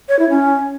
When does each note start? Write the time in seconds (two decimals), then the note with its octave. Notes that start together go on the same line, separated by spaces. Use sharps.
0.09 C#5
0.19 E4
0.30 C#4